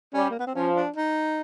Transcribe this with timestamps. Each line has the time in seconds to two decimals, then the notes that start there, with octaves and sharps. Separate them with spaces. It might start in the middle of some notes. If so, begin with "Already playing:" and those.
0.14 G3 C#4
0.31 A#3
0.39 B3
0.47 C4
0.55 F3 C#4
0.75 D4
0.96 D#4